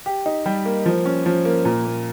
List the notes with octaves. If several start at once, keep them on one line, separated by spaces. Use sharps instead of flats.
G4
D#4
G3
A#3
F3
C#4
F3
A#3
A#2
A#3